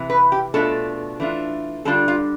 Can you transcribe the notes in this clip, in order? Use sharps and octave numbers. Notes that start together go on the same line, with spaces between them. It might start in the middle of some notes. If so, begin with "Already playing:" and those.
Already playing: C3 E3
B4
G4
B2 A3 D4 F4 A4
E3 A3 D4 F4
D3 G3 D4 F4 A4
F4